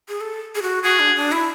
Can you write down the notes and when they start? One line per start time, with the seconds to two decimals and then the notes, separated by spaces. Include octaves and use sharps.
0.09 G#4
0.21 A4
0.55 G#4
0.62 F#4
0.83 F#4 G#4
0.99 D4
1.16 D4
1.32 E4